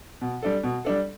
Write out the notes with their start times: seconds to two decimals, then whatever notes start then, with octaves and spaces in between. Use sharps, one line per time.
0.21 B2
0.43 G3 D4 A4
0.64 B2
0.85 G3 D4 A4